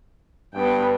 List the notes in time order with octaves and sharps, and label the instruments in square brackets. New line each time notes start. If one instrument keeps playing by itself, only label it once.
[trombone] G2 [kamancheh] B3 G5